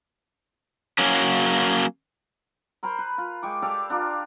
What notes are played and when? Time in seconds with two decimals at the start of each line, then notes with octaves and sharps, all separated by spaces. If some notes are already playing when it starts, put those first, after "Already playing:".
0.98 F#3 A#3 C#4
2.83 A#4 C5 G#5 B5
2.98 B4
3.18 F4
3.43 G#3 G5 C#6 D6
3.62 G4 A4 D5 F5
3.90 D4 F4 A#4